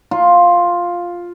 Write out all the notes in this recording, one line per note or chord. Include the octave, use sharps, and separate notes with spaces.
F4